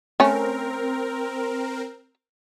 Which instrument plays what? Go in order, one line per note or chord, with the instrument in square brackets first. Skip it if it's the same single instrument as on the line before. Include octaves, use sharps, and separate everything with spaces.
[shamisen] A3 C#4 [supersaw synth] C4 A#4